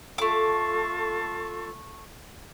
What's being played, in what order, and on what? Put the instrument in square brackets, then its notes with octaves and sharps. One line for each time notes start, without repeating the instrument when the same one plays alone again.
[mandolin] A3 D6 [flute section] F4 A4 C#6